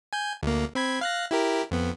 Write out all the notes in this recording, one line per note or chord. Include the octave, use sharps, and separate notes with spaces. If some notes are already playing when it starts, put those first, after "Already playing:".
G#5 G6
D2 A#3
C4 B5 G#6
F5 F#6 A#6
E4 G4 A#4
F2 B3